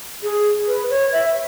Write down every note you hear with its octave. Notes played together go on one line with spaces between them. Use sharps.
G#4
B4
C#5
E5